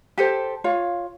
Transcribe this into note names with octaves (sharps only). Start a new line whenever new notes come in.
G4 A4 C5
F4 C#5 F5